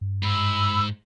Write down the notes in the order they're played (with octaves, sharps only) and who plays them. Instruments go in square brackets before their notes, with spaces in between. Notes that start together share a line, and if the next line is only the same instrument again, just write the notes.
[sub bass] G2
[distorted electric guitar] G#2 [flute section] B5 E6